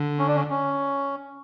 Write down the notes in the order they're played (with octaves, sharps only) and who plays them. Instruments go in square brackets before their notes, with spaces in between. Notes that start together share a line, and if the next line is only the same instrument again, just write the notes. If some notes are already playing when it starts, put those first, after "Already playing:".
Already playing: [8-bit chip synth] D3
[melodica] C#4
D4
C#4
C#4